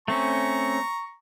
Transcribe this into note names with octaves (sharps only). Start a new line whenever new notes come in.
A3 C4 C#4 A#5 C#6